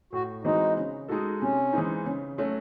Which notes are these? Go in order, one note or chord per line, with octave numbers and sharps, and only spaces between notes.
A2 F#4
E3 G#3 C4 D#4 F#4
C#3
G#3 D#4 F#4 A4
C3 C#4
E3 G#3 C4 D#4
C#3
F#3 A3 C#4 F#4